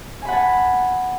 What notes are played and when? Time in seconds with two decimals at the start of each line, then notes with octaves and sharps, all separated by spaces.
0.22 G#5
0.25 B5
0.28 F#5
0.32 A5